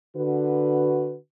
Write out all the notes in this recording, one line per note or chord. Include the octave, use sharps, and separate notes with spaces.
D3 F#4 B4